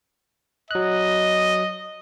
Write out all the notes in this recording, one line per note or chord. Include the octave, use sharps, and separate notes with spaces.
F#3 D#5 F#6